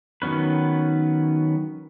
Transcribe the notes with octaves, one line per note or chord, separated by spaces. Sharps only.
D#3 F#3 B3 C#4 B4